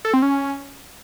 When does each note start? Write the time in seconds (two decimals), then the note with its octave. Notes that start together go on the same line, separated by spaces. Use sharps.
0.05 A4
0.13 C4
0.22 C#4